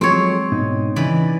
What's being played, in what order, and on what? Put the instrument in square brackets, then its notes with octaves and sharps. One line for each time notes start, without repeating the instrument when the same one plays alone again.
[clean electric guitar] F3 F#3 G#3 [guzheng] C4 C#5
[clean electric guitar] G#2 B2 D#4
[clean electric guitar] C#3 D#4 [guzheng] E3 B4 D5